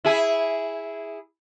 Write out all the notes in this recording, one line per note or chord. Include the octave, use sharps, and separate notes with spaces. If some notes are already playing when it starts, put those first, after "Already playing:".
E4 G#4